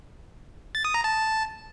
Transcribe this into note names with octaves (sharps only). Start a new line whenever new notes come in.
A6
D#6
A#5
A5